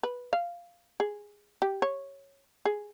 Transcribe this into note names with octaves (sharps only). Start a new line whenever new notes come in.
B4
F5
G#4
G4
C#5
G#4